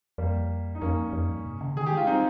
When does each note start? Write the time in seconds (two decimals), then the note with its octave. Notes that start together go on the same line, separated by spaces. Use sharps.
0.18 F2 G3 A#3
0.75 D#4
0.81 F2 A#3 C#4
1.13 F2
1.29 G2
1.45 C3
1.61 C#3
1.76 D#3 G#4
1.86 G4
1.92 G#3
1.97 F4
2.07 G3 C4 D#4